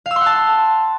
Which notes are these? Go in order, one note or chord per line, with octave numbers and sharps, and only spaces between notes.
F5
E6
C6
F#5
A5